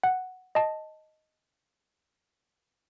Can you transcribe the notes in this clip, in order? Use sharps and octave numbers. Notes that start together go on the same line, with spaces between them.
F#5
D#5 A5